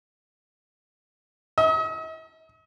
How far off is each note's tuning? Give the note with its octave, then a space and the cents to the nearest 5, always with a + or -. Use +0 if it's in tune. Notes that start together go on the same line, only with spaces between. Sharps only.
D#5 +45